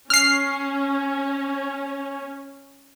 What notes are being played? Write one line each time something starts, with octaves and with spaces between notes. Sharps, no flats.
C#4 F6 C7